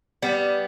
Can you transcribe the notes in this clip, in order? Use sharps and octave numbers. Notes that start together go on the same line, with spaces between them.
G3 B3